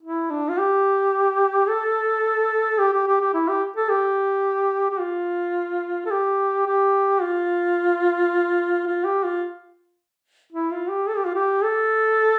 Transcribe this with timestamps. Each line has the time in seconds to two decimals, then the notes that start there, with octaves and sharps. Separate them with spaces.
0.03 E4
0.30 D4
0.49 F4
0.58 G4
1.68 A4
2.79 G4
2.94 G4
3.07 G4
3.21 G4
3.34 E4
3.48 G4
3.76 A4
3.89 G4
4.91 G4
5.00 F4
6.06 A4
6.11 G4
6.66 G4
7.22 F4
8.87 F4
9.05 G4
9.24 F4
10.52 E4
10.71 F4
10.89 G4
11.08 A4
11.17 G4
11.26 F4
11.35 G4
11.63 A4